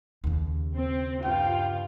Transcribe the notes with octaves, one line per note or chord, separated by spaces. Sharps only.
D#2 C#3
C4
G2 F4 G5